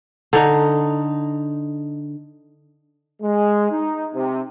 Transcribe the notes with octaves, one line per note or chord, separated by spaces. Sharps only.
D3 D#4
G#3
D#4
C3